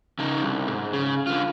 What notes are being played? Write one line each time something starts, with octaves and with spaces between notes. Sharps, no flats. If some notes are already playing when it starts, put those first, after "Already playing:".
C#3 D#4
C2
G#2
C#3
D3 F4